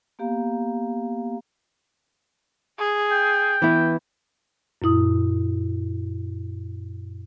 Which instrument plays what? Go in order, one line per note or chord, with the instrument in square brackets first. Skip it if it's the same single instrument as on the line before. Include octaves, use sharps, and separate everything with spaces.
[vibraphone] A#3 B3 G4 F5 A#5
[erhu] G#4
[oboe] G5
[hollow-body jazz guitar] E3 B3 E4
[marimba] F#2 A#2 E4 D#6